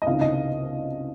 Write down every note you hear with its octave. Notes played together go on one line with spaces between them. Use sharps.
D#5
C#2 C3 D#3 F5
D#5